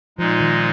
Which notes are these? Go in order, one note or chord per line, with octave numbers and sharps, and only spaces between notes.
A#2 F3 G#3 D#4
D#3